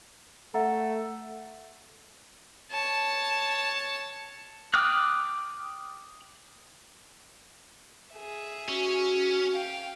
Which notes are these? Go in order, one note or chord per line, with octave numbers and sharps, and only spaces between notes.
A3 A4 E5 F#5 A#5
C#5 A5
G5 D6 D#6 F6 F#6
G#4 E5
C#4 F#4
F5 G5